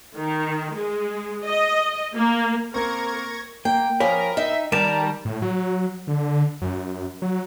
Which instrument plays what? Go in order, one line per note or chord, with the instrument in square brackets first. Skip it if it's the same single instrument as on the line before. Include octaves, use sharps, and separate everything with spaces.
[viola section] D#3
G#3
D#5
A#3
[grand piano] A#3 C4 [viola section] A#4 [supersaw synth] C#6 G#6 A#6
[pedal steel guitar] A#3 [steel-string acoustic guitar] G5
[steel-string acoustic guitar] F3 A#3 C#4 [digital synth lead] A#4 [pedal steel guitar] B5
[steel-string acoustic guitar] D#4 [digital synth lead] E5
[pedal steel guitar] D#3 A5 A#5 [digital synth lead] G3 [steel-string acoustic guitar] A#4
[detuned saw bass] A2
F#3
D3
F#2
F#3